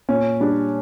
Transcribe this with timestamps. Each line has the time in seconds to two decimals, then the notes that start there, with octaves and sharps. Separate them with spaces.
0.09 A#2 C#4
0.40 G3 D4